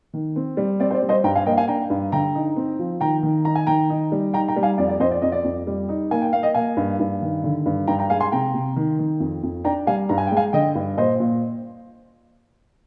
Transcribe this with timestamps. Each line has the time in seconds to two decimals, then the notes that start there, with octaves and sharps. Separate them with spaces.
0.13 D#3
0.36 C4
0.57 G3
0.80 C4 D5
0.90 C5
0.94 D5
1.02 G3
1.09 C5 D#5
1.24 G2 G5 A#5
1.35 F5 G#5
1.46 A#3 D#5 G5
1.57 F5 G#5
1.68 D4 G5 A#5
1.90 G2
2.12 D3 G5 A#5
2.35 D#4
2.56 C4
2.79 F3
3.01 D#3 G5 A#5
3.23 D#3
3.45 D#4 A#5
3.55 G#5
3.67 D#3 G5 A#5
3.90 D#4
4.12 G3
4.34 D#4 G5 A#5
4.48 G5 A#5
4.56 G3
4.63 F5 G#5
4.78 F2 D5
4.89 D5
5.00 F2 C5 D#5
5.11 D5
5.22 F2 D#5
5.32 D5
5.44 F2
5.67 G3
5.89 D#4
6.11 A#3 G#5
6.22 G5
6.33 A#3 F5
6.43 D#5 G5
6.54 A#3 F5 G#5
6.77 G2
6.99 G2
7.22 D#3
7.44 D3
7.66 G2
7.87 G2 G5 A#5
7.99 G5 A#5
8.10 G#3 F5 G#5
8.20 G#5 C6
8.32 C3 G5 A#5
8.54 C3
8.76 D#3
8.99 D#3
9.20 F2
9.43 F2
9.64 D4 G5 A#5
9.87 G3 F5 G#5
10.09 G2 A#5
10.18 G#5
10.27 G5
10.31 G#3
10.37 F5 G#5
10.53 D3 D#5 G5
10.75 G2
10.97 A#2 C5 D#5
11.20 A#2